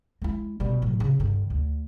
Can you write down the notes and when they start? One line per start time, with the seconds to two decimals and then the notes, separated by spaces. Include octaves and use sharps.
0.22 G#3 E4
0.60 B2 G3
0.82 A2 F#3
1.00 C#3
1.19 G2 D3
1.50 D2